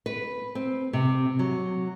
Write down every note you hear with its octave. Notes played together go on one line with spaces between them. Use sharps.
B4
C4
C3
F#3